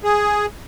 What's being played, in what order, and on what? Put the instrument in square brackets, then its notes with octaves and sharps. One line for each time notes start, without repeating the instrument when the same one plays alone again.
[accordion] G#4